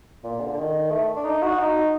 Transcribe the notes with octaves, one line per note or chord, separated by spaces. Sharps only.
A#2
D3
D3
D#3
A3
D4
D#4
F#4
D#4